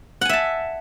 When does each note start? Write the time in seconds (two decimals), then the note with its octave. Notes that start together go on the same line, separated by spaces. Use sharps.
0.21 F#5
0.25 G#5
0.29 E5
0.33 A5